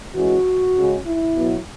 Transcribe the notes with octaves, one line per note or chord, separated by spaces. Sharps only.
E3 G#3 C#4 F#4
C#3 G#3 C#4
E4
B2 F#3 B3